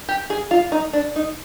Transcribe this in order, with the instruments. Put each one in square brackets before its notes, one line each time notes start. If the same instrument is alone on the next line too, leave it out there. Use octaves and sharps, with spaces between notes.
[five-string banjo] G4
G#4
F4
D#4
D4
D#4